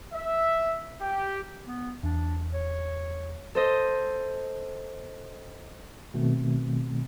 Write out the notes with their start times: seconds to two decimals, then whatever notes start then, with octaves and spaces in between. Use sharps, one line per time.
0.12 E5
1.01 G4
1.66 B3
2.03 E2 D4
2.53 C#5
3.55 A4 C5 D#5
6.14 B2 D#3 A3 C4